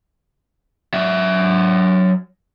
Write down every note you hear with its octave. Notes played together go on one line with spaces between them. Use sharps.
F#3 E5